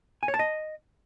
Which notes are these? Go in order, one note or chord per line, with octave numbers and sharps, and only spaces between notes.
G#5
C#5
A5
D#5